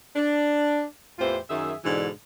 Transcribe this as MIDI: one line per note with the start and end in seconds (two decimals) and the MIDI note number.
0.16 0.85 62
1.19 1.38 40
1.19 1.38 45
1.19 1.38 52
1.19 1.38 65
1.19 1.38 67
1.19 1.38 72
1.49 1.74 42
1.49 1.74 51
1.49 1.74 68
1.49 1.74 76
1.85 2.10 44
1.85 2.10 47
1.85 2.10 50
1.85 2.10 52
1.85 2.10 62